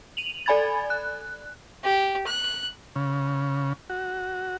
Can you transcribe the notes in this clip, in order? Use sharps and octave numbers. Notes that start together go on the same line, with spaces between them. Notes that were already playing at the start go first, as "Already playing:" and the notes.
D#7 F7 F#7
A4 D5 G#5 B5 G#6 A6
F#6
G4
F#6
C#3
F#4